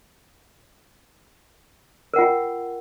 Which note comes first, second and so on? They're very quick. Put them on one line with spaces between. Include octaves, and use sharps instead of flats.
A#4 F#5 F4 G5